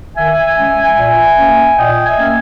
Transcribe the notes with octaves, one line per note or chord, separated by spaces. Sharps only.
D#3 E5 G#5
G#3 C#4
A#2
A#3 C#4
A#2 D#5 G5
E5 G#5
A#3 C#4